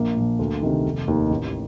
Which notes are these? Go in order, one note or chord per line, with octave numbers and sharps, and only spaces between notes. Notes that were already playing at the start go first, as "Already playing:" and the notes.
Already playing: A#1 A#3
A#2 F3
D2
C3 D#3
F1
D#2 D#3
A1